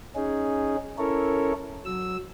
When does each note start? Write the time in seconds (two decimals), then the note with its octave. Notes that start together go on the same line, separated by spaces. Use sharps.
0.15 C#4 D#4 G#4
0.98 C#4 E4 A4 A#4 C#5
1.85 F#3 E6